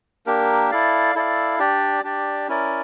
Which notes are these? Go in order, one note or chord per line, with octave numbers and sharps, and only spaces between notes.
A#3 D4 G4 A#4
E4 A4 D5 F5
E4 A4 D5 F5
D4 G4 D5
D4 G4 D5
C#4 E4 A#4 D5